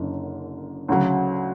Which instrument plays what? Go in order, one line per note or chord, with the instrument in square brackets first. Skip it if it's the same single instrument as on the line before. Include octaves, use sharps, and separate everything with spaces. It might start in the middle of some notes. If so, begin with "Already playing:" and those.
Already playing: [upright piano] F#1 F#2 D3
D2 C#3 F#3